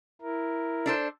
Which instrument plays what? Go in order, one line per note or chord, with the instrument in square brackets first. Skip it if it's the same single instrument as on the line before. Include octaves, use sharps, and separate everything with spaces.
[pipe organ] E4 A#4
[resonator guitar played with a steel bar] D4 A4 C5